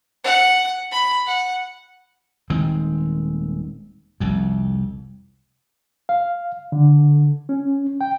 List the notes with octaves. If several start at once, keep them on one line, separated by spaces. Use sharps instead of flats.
F#5
B5
F#5
D#1 D#3 G#3 C4
F1 C2 F2
F5
D3
C#4
G5